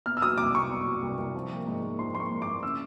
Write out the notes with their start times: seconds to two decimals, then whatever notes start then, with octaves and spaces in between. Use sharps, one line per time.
0.06 B2 F6
0.17 E6
0.22 F#3 D#6
0.38 C2 D6
0.55 C2 C#6
0.70 B2
0.86 F#3
1.02 C2
1.18 C2
1.35 F3
1.51 A#3
1.67 G#2
1.82 G#2
1.99 F3 C6
2.15 A#3 C6
2.20 C#6
2.31 G#2
2.42 D6
2.47 G#2
2.63 C#3 E6